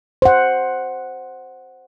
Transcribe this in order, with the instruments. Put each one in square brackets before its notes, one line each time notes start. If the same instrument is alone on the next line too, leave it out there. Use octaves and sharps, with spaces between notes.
[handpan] C5 F#5